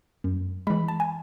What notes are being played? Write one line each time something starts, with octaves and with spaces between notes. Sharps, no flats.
F#2
E3 G#3 B5
A5
G#5